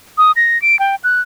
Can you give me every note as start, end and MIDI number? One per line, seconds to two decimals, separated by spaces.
0.18 0.32 87
0.36 0.60 94
0.62 0.79 98
0.79 0.95 79
1.04 1.21 90